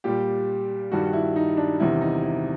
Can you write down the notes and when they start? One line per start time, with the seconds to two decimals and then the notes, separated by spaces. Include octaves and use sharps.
0.04 A#2 G3 G4
0.92 G2 D#3 G3 F#4
1.13 E4
1.36 D#4
1.57 D4
1.79 E2 C3 D#3 G3 E4
2.01 D#4
2.23 E4